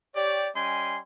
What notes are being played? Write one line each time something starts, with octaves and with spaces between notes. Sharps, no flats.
G4 C#5 D5
G3 C#4 D#5 G5 G#5 C6